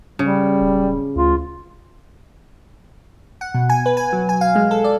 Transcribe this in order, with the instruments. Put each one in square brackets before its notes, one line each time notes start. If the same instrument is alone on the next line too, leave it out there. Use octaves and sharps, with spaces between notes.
[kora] C#3 [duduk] G3
[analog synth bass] D1
[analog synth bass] D2 [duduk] F4
[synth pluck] F#5
B2
G#5
B4
G#5
F#3
G#5
F5
G#3
A4
D5